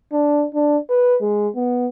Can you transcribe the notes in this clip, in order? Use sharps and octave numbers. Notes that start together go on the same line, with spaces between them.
D4
D4
B4
G#3
B3